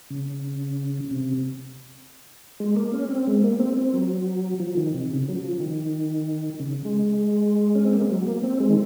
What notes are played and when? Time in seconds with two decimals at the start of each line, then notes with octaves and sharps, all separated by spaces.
0.10 C#3
1.11 C3
2.60 G#3
2.76 A#3
2.93 C#4
3.10 C4
3.27 G#3
3.43 A#3
3.60 C4
3.77 C4
3.94 F#3
4.60 F3
4.77 D#3
4.94 C3
5.11 C#3
5.29 F#3
5.35 F3
5.60 D#3
6.60 C#3
6.85 G#3
7.75 C#4
7.85 C4
7.93 A#3
8.01 G#3
8.11 F#3
8.27 A#3
8.43 C4
8.60 G#3
8.69 D#3